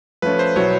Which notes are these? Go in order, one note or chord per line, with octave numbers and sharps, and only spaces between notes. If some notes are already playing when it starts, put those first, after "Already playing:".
F3 A3 C#4 B4
C5
B2 F#3 B3 E4 C#5